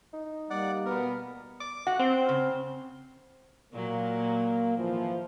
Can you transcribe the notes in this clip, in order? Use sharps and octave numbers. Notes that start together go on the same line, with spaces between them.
D#4
G3 A#3 D5 F#5
B2 B3 A#4
D6
F#4 F#5
C4 C5
C#3
A#2 F#3 A#3
G#1 E3 F3